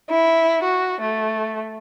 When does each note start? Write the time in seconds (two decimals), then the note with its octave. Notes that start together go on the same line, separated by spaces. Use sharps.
0.11 E4
0.64 F#4
1.01 A3